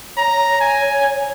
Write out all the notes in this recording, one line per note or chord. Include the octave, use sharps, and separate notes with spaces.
C#5 A#5
G#5